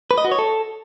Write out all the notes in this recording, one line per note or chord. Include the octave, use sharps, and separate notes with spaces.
B4
D#5
F#4
C#5
A4